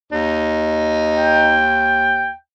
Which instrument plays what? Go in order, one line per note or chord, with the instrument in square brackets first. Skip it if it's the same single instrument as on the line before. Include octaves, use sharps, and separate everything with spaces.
[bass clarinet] D#2 [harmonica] D#4
[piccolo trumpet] G5